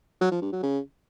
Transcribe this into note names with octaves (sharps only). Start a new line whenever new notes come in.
F#3
F3
G2
F#3
C#3